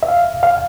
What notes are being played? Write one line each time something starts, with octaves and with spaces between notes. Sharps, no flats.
E5
F5
F5